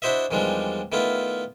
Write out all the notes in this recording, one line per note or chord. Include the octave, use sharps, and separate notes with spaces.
D4 E4 F#4 C5 D#5 E5
E2 D#3 F3 G3 G#3 D4
D#3 A3 B3 E4 F4